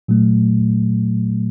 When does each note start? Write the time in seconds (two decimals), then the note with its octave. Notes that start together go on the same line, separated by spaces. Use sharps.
0.08 A#2 F#3 A3